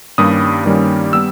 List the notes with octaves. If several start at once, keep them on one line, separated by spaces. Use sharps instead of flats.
G2 D#3 G3 A#3 C#4 D#6
G2 D#3 G3 A#3 C#4
G3 B3 E6